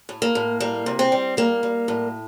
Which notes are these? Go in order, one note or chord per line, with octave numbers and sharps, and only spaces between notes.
A2
A#3
A2
G3 A#3
C3
C4
G3
G3 A#3
G3
A2